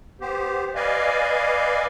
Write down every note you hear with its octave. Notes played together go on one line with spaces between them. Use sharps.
B3 G4 C5
B4 D5 D#5 F5 G#5